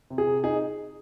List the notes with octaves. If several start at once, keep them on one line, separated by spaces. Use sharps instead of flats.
C3
G#4
C3
D#4 G#4